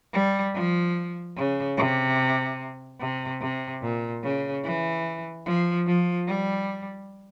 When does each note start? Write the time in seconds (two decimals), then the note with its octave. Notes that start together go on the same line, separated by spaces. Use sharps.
0.14 G3
0.55 F3
1.37 C#3
1.77 C3
3.00 C3
3.41 C3
3.82 A#2
4.23 C#3
4.64 E3
5.46 F3
5.87 F3
6.28 G3